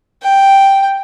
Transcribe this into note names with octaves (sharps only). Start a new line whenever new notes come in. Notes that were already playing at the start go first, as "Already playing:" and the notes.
G5